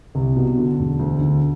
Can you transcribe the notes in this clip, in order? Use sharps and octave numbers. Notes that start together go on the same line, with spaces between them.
C2
B2
D3
E1
D2
D3